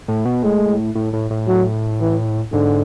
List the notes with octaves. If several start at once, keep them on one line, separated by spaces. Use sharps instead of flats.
A2
B2
A2 G#3
A2
A2
A2
F#3
E3
G#2 D3